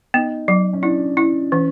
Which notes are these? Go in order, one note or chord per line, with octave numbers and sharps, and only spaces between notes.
B3 D#4
F#3
C#4
D4 E4
E4
E3 C#4